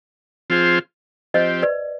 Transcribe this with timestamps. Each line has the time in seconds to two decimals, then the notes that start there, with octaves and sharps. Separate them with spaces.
0.50 F3 C4 F4 G#4 C5
1.34 F3 C4 G4 C5 D#5
1.63 B4 D5